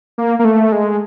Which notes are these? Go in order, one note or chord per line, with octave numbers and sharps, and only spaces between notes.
A#3
A#3
A3
G#3